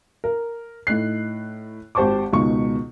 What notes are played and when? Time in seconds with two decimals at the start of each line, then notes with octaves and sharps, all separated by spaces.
0.24 A#4
0.87 A2 D#4 F#6 C7
1.95 G#1 G4 C5 A5 C#6 D6
2.33 C#2 B2 D#3 C#6